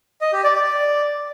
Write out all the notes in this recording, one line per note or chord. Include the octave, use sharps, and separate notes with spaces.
D#5
G4
D5
D5